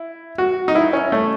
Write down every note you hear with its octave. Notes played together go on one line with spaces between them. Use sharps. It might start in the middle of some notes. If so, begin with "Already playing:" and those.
Already playing: E4
F#4
D#4
E4
C#4
A3